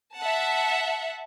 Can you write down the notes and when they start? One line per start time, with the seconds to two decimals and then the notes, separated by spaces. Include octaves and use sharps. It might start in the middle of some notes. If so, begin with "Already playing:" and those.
0.15 E5 F#5 A5